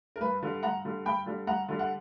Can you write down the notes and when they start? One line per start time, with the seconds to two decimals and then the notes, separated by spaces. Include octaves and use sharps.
0.16 A#4
0.21 G2 B4
0.42 D3 G3
0.63 G2 F#5 A#5
0.85 D3 G3
1.06 G2 G5 B5
1.26 D3 G3
1.47 G2 F#5 A#5
1.68 D3 G3
1.79 F#5